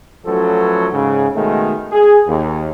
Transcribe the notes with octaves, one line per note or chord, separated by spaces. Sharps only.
F3 F#3 A3 C#4 A4 B4
G#2 C#3
B2 D#3 G#3 A3
G#4
D#2